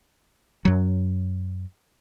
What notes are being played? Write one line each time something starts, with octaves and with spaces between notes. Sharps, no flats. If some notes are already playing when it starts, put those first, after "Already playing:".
F#2 F#3